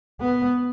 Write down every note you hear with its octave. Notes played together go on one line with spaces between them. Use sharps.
B3